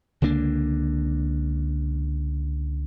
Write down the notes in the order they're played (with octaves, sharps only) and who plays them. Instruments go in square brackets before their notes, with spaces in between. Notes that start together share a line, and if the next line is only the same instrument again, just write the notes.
[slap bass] C#2 D3 A#3 D4